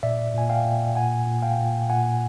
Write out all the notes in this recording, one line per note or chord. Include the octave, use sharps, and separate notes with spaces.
A#2 D5 E5
A#2 G#5
F5 G5
A#2
A#2 F#5 G#5
A#2
F5 G5
A#2
A#2 F#5 G#5